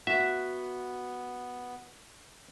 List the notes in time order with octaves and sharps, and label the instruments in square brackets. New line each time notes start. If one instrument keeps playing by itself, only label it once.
[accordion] B3 [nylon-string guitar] F#4 [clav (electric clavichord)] E5